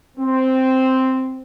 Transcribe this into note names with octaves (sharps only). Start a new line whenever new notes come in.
C4